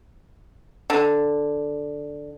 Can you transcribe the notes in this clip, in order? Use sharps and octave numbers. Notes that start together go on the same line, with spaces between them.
D3